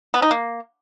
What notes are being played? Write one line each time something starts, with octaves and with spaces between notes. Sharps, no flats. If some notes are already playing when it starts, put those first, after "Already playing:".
B3
D#4
A#3